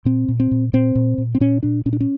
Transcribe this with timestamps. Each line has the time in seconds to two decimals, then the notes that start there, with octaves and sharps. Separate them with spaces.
0.05 A#2 C4
0.28 A#2
0.40 C4
0.51 A#2
0.73 A#2 C4
0.95 A#2
1.18 A#2
1.35 C4
1.40 A#2 C#4
1.63 A#2 D4
1.86 A#2 C#4
1.93 D4
2.01 C#4